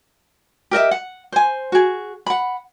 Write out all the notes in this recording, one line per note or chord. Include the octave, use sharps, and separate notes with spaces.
G4 A#4 D#5 E5
F#5
C5 G#5
F#4 G#4
F#5 B5